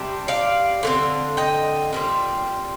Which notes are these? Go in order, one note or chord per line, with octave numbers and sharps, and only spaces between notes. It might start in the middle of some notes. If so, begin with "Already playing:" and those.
Already playing: C3 G3 D4
D5 F5
D3 A3 C4
D#5 G5
A#2 G3 C4